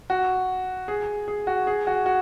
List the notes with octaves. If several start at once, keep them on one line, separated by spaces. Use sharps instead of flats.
F#4
G#4
G#4
F#4
G#4
F#4
F#4